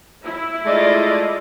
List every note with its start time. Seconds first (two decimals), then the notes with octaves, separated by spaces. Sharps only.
0.25 E4
0.66 G#3 A3 F4 D5 D#5